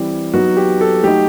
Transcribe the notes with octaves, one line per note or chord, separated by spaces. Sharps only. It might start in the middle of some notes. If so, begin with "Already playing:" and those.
Already playing: E3 G3 C4 E4 G4
F#3 B3 D#4 F#4
G4
A4
F#3 A3 D#4 G4